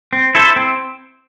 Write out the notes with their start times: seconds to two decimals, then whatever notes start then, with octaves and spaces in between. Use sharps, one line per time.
0.13 C4
0.35 E4 A4 C5
0.56 C4